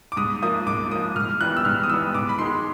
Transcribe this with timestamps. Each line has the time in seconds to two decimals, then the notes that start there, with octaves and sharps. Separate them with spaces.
0.12 D6
0.17 G#2 D#6
0.42 F3 A#3 D#6
0.67 G#2 D6
0.91 F3 A#3 D#6
1.15 G#2 F6
1.41 E3 G3 B3 F#6
1.57 E6
1.65 G#2 F6
1.83 D#6
1.90 E3 G3 B3 E6
2.14 G#2 D6
2.29 B5
2.39 D#3 G#3 C6